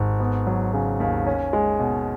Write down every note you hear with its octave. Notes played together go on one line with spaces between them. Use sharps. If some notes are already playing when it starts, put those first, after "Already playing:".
Already playing: G#1
B3
F#3
C#3
D#2
C#4
G#3
B2